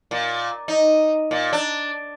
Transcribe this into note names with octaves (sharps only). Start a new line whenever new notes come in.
A#2
D#4
A#2
D4